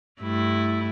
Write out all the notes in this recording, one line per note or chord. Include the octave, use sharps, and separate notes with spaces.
G2 A3 E4